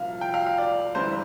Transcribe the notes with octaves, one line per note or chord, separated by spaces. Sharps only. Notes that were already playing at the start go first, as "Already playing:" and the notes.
Already playing: C2 A#2 F3 F5
G5
F5
F5
D5
G1 G2 E3 G3 C5